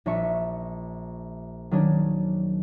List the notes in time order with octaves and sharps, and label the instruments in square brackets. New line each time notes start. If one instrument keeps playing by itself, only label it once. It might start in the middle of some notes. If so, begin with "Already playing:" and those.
[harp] A#1 D4 E5 C#6 C#7
D#3 F#3 C#4 D4